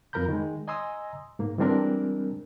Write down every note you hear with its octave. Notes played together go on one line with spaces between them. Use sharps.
F2 F4 A#4 A#5 B5 G6
D#3 G#3
D#5 G#5 A#5 C6 D#6 E6
G#2 A#3
E3 G3 G#3 C4 D4 A#4